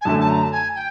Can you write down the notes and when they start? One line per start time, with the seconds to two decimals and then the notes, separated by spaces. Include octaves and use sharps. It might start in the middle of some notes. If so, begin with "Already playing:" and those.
0.01 G#5
0.05 F#2 D3 F#3 A3 A5
0.20 A5
0.29 A#5
0.43 A5
0.52 G#5
0.75 G5